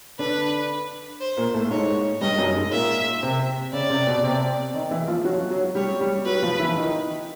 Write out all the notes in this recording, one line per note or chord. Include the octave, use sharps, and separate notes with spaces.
D3 D4 B4
C5
A#2 A#3
A2 A3
G#2 G#3 C#5
G2 G3 D#5
F#2 F#3
G#2 G#3
A#2 A#3 E5
C3 C4
C#3 C#4 D5
C3 C4
B2 B3
C3 C4
D#3 D#4
E3 E4
F3 F4
F#3 F#4
F#3 F#4
G3 G4 C#5
G3 G4
F#3 F#4 B4
F3 F4
E3 E4
D#3 D#4